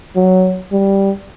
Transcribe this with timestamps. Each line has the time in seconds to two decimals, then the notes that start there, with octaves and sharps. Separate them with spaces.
0.16 F#3
0.72 G3